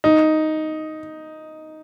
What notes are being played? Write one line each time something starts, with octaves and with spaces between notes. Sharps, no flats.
D#4